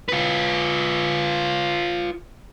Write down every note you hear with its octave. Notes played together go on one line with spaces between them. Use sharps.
F4 B4